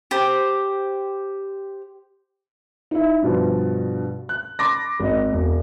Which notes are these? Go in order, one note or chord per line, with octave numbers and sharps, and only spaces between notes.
G4 C5
D#4 E4
G2 B2 F3
F#6
B5 C6 D6 A6 A#6
G#1 D#5
E1